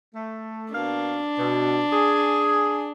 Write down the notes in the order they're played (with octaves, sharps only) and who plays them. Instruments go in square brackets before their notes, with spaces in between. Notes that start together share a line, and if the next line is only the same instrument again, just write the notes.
[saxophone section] A3
[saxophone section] B2 A#3 F5 [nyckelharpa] D4
[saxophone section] B2
G#4